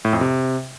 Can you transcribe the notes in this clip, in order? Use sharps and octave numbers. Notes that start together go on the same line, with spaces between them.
A2
F2
C3